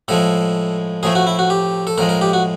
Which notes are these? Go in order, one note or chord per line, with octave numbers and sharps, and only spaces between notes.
A2 F3 G#3 A4
A2 F3 A3 G#4
F#4
E4
F#4
G4
A4
A2 F3 G#3 A#4
A#4
G4
F#4